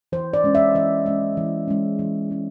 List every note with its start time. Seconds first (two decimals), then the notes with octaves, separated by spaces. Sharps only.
0.12 E3 C5
0.33 D5
0.44 G#3 C#4
0.55 E5
0.75 E3 D#5
1.06 G#3 C#4 D#5
1.37 E3
1.68 G#3 C#4
1.99 E3
2.30 G#3 C#4